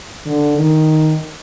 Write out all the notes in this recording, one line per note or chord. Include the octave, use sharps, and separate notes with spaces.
D3
D#3